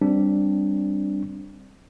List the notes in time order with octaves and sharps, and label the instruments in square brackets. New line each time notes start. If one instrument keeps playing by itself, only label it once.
[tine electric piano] G3 C4 D4